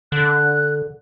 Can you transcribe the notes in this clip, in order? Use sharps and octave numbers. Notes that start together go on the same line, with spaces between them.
D3 F#6